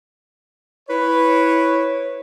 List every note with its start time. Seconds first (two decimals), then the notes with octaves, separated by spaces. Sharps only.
0.89 E4 B4 C#5